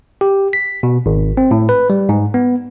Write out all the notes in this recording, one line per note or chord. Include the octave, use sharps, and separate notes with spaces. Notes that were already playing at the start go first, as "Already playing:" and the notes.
G4
B6
B2
G#1
C4
A2
B4
G3
G#2
B3